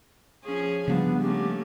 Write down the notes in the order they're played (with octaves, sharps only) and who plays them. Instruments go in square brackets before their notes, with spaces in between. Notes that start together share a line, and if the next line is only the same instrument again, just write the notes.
[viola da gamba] F3 C#4 G#4
[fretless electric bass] C#3 F3 G3 [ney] B3 [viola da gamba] D4
[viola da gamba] A3 A#3 C#4 [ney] G4